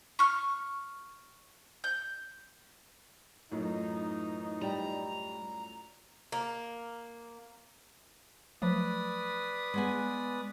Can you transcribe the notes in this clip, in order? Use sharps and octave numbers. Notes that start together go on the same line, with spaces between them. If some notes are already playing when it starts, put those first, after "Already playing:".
C#6 F6
G6
F#2 A2 E3 D#4 F4
G3 A#5
A#3
F3 F#3 A3 B4 D5 D#6
G#3 B3 G#5